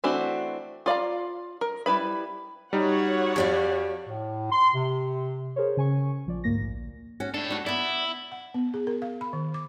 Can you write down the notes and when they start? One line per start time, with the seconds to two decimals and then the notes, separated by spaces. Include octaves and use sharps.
0.04 E3 A3 C4 D4 F#4
0.86 F4 D5 F5 A#5
1.61 A#4
1.86 G3 E4 B4 B5
2.73 G3 D#4 F#4 C#5 F#5
3.36 F2 G4 D5 F5
4.07 A2
4.51 C6
4.74 C3
5.56 G#4 A#4 C5 C#5
5.77 C#3 G#5 C#6
6.26 A#1 F3 D5
6.44 D2 G#2 A#3 A#6
6.60 A#1
7.20 C#4 F#4
7.34 A2 D4 A4
7.50 D4 F#4
7.66 B3 E4 D5
8.32 F#5
8.54 B3
8.74 G#4
8.87 A#4
9.02 F5
9.21 B5
9.33 D#3
9.54 D6